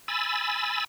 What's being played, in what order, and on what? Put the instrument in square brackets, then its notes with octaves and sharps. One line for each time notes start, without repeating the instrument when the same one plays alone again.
[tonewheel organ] G#5 B5 E6 A6